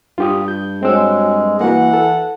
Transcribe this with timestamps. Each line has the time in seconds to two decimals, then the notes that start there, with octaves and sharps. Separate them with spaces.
0.18 G2 F4 G4 D#6
0.48 G6
0.83 F#3 G#3 C4 E6
1.61 E3 A#3 F#4 F#5
1.93 A4